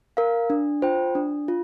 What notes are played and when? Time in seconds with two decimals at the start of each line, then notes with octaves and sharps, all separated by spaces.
0.17 A#4 F5
0.50 D4
0.82 F4 C5 G5
1.15 D4
1.48 F4